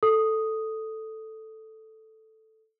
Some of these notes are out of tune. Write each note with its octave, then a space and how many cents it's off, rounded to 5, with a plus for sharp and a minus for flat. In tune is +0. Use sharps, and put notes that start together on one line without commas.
A4 +0 D#6 +0